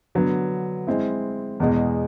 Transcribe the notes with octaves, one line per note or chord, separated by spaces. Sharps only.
D3 F#3 B3
G#3 C4 E4
E2 B2 G#3